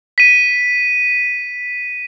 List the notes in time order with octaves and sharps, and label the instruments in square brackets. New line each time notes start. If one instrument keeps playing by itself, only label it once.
[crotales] B6 D#7